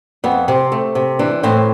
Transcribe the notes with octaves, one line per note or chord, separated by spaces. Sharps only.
F2 B3
C3 C4
A3
C3
E3 D4
A2 C4